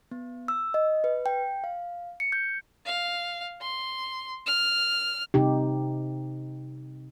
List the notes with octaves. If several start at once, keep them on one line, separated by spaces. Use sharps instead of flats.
B3
E6
D#5
B4
G5
F5
C#7
G6
F5
C6
F6
C3 D#4 G4